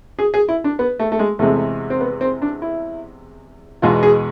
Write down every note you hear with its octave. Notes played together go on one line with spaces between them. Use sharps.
G#4
G#4
E4
D4
B3
A3
A3
G#3
E2 C3 G#3 A3
C4
B3
C4
D4
E4
E2 B2 G#3 F4
G#4